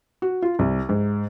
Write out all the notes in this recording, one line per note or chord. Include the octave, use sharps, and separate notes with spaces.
F#4
F4
C2
G#2